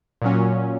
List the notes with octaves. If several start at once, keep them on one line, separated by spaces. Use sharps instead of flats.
A#2 F#3 C#4